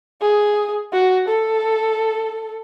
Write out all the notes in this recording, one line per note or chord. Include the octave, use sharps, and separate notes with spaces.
G#4
F#4
A4